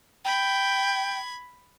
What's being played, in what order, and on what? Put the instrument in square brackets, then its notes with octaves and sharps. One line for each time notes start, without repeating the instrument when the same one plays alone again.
[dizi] G5 [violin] B5 G#6